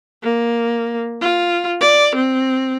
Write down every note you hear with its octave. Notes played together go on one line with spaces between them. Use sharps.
A#3
F4
D5
C4